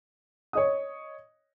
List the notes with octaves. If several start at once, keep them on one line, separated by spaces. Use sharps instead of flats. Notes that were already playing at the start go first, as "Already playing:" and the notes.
C#5 D#5 D#6